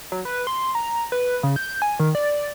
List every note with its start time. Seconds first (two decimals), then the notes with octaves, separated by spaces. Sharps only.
0.12 F#3
0.25 B4
0.47 C6
0.75 A#5
1.12 B4
1.43 C#3
1.56 G6
1.82 G#5
2.00 D#3
2.15 D5